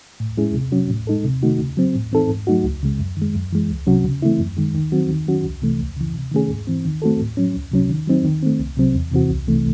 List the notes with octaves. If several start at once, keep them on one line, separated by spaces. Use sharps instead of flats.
A2
G#3 C#4 E4 G#4
C3
F#3 C#4 F#4
A2
G#3 D#4 A4
C3
D#3 A3 D#4 F#4
C#3
F#3 C4
A2
E3 C4 D#4 A4
G#2
F#3 A3 D#4 F#4
C#2
C#3 G#3
F#2
D#3 G#3
F#2
E3 G#3
C#2
C3 F#3 C#4 F#4
C#3
E3 A3 C4 E4
F#2
D#3 G#3
D#3
F#3 C4 F#4
D#3
F#3 C#4 F#4
C2
C3 E3 A3
C#2
C#3 E3
C3
D#3 A3 C#4 G#4
G#2
E3 C4
D#3
A3 C4 F#4 A4
A2
F#3 C#4
C#2
C3 F#3 C#4
D#3
F#3 C4 D#4
D#3
A3 C4
C2
C3 F#3 C4
E2
C3 E3 C4 F#4
C2
C3 E3 A3